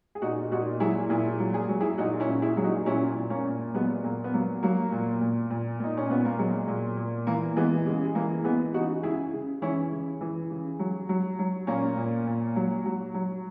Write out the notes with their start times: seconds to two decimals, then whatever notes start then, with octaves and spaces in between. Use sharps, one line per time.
0.15 G#4
0.22 A#2 D#4 F#4
0.51 A#2 D#4 F#4
0.80 F#3 E4 G#4
1.10 A#2 E4 G#4
1.40 F#3
1.54 G#4
1.69 F#3
1.81 E4 G#4
1.98 A#2 D#4 F#4
2.20 C#4 E4
2.28 A#2
2.42 E4 G#4
2.57 F#3 G#4
2.64 D#4 F#4
2.86 A#2 C#4 E4
3.16 A#2
3.30 A#3 C#4
3.45 A#2
3.74 F#3 G#3 B3
4.04 A#2 A#3
4.24 B3
4.34 F#3 A#3
4.63 F#3 A#3
4.92 A#2
5.21 A#2
5.50 A#2
5.80 A#2 D#4
5.97 C#4
6.10 A#2 B3
6.25 A#3
6.39 F#3 G#3
6.68 A#2
6.97 A#2
7.27 E3 A#3
7.56 E3 G#3 B3
7.85 C#3 G#3
8.04 G#3
8.15 E3 A#3
8.44 E3 G#3 B3
8.74 C#3 D#4 F#4
9.03 C#3 E4 G#4
9.33 C#3
9.62 E3 C#4 E4
9.92 C#3
10.21 E3
10.50 C#3
10.79 F#3
11.09 F#3
11.39 F#3
11.67 A#2 A#3 C#4
11.97 A#2
12.27 A#2
12.56 F#3
12.86 F#3
13.14 F#3